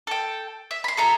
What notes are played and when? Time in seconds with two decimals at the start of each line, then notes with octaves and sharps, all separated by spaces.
0.07 A4 G5
0.71 E5
0.84 B5 C6
0.97 G#4 A4 E5 A#5